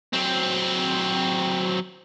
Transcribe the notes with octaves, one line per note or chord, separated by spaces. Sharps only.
F#3 C4